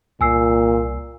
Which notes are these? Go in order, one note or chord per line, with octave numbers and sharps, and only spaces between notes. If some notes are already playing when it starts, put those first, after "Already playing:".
C2 A#2 G#5 E6 C7